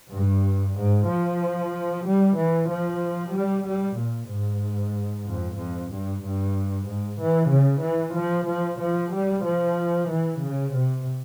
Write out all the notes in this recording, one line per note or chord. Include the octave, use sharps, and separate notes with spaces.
G2
G#2
F3
G3
E3
F3
G3
G3
A#2
G#2
F2
F2
G2
G2
G#2
E3
C#3
E3
F3
F3
F3
G3
F3
E3
C#3
C3